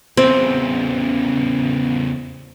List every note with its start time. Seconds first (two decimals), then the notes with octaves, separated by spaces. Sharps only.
0.17 E2 C#3 C4